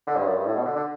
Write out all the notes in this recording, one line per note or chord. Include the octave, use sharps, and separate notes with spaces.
D3
G2
F#2
G2
A2
B2
D3
D3